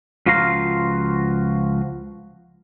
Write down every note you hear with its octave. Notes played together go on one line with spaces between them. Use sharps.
C#2 F3 F4 F#4 F5 A#5